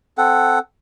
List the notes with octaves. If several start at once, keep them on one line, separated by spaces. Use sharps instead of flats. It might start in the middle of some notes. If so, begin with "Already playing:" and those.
C4 A4 F#5